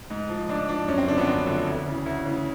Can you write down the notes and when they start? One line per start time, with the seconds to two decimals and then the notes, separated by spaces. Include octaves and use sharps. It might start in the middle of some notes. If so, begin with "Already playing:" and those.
0.10 G#2
0.29 F3
0.49 G#2 D4
0.69 F3 D4
0.88 F#2 C#4
0.98 C4
1.08 D3 F3 D4
1.18 B3
1.27 F#2 C4
1.47 D3 F3
1.67 D2
1.86 C#3 E3
2.06 D2
2.25 C#3 E3